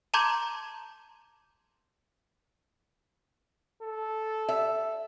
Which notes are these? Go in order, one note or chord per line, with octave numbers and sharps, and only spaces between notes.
A5 A#5 C6 D6 G6 G#6
A4
E5